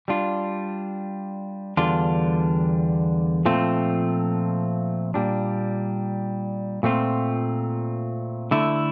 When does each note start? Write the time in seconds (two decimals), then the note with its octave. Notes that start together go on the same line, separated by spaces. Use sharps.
0.08 G3 D4 F4
1.77 E2 D3 G3 D4 F4
3.46 A#2 F3 A3 C4 F4
5.14 A#2 G3 D4
6.83 A#2 A3 C4 F4
8.51 D3 A3 E4